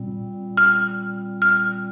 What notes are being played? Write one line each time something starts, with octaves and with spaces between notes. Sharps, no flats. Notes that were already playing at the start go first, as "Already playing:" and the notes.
Already playing: A#2 G3 C4
F6
F6